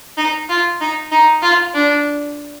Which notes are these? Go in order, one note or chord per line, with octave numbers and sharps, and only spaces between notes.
D#4
F4
D#4
D#4
F4
D4